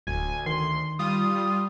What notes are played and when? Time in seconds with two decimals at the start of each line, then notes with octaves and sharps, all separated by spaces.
0.07 D1 D2 G#5
0.46 D#3 C6
0.99 G3 F4 D#6